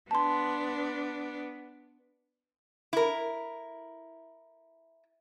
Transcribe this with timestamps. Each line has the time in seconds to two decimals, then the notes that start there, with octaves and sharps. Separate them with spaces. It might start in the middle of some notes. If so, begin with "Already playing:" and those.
0.11 B3 D4 A5 C6
2.93 E4 A#4